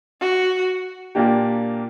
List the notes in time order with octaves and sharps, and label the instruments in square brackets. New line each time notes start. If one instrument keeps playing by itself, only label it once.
[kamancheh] F#4
[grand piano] A#2 A#3 D4 G4